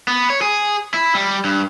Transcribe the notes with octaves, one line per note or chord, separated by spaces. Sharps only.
B3
C#5
G#4
E4
G3
G2